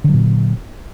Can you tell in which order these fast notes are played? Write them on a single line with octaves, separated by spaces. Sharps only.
D3 F#3 A#2